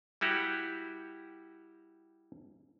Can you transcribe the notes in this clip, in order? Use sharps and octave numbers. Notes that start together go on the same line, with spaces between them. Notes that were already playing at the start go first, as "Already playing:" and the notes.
G3 E4 F#4 G4